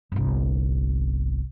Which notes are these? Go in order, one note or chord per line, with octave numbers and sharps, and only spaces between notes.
G1 C2